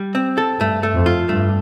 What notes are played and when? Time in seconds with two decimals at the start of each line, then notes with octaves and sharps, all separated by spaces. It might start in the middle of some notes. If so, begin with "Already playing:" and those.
Already playing: G3
0.15 C4
0.38 A4
0.60 G2 A3
0.83 A3
0.95 F2
1.06 F4
1.29 G2 A3